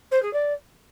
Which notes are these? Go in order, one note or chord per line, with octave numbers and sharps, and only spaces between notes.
C5
G#4
D5